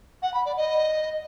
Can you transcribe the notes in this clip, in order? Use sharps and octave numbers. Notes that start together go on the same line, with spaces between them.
F#5
B5
D5
D#5